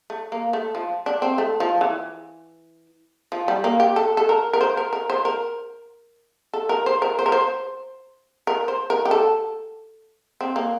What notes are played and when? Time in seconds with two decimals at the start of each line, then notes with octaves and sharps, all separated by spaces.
0.10 A3
0.32 A#3
0.53 A3
0.75 F3
1.06 D4
1.22 C4
1.38 A3
1.60 F3
1.81 E3
3.32 F3
3.48 G3
3.64 A#3
3.80 G4
3.96 A4
4.17 A4
4.29 A#4
4.53 A#4
4.61 C5
4.77 A#4
4.93 A#4
5.10 C5
5.25 A#4
6.54 A4
6.69 A#4
6.86 C5
7.02 A#4
7.19 C5
7.26 A#4
7.32 C5
8.47 A#4
8.68 C5
8.90 A#4
9.05 G4
9.11 A4
10.41 C4
10.56 A#3